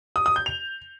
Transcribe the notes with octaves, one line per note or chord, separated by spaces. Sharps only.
D#6
D#6
G6
F7